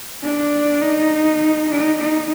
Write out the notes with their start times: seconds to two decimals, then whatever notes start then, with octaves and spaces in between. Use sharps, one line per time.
0.23 D4
0.82 D#4
1.71 D#4
1.99 D#4